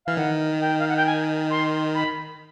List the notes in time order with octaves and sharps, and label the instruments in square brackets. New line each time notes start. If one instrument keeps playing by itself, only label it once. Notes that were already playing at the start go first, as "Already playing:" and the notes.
[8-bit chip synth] E3 [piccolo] F5
[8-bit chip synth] D#3 [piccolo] F#5
[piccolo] G5
F5
F#5
G5
G#5
C6
B5